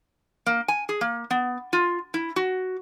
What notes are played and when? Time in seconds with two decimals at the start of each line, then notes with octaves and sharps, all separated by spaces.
0.46 A#3
0.68 G#5
0.89 G#4
1.01 A#3
1.31 B3
1.73 F4
2.14 E4
2.36 F#4